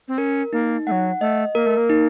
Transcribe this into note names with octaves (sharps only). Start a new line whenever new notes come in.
C4
C#4 A#4
A#3 D#4
F#3 A3 F#5
A3 D#5
A#3 A#4
A3
A#3
D#4